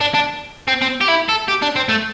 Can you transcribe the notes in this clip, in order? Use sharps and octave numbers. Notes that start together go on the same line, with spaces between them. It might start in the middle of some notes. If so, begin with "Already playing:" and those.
D4
D4
C4
C4
G4
E4
A4
G4
D4
C4
A3